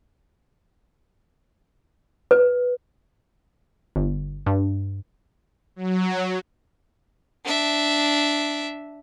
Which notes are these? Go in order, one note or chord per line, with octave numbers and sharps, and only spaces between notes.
B4
G1
G2
F#3
D4 E5